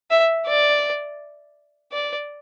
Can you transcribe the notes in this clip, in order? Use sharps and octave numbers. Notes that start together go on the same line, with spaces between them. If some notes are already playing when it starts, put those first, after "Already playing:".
E5
D5
D5